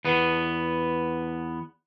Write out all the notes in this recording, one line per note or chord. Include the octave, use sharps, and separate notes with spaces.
E2 B3